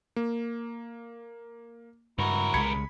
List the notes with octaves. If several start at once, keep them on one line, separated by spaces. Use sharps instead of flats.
A#3
C#2 G2 E4 F#4 A#4
C2 C#3 G#3 B5 G#6 C#7